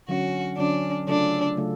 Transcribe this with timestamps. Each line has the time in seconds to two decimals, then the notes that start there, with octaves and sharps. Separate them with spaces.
0.08 D3 F#3 C#4 F#4
0.58 D3 F#3 C#4 D4
1.07 C#3 F#3 A3 D4 F4 A4
1.57 C#3 F#3 A3 F4 A4